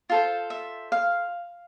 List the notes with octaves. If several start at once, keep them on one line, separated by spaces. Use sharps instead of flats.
F4 A4 C5
E5
F5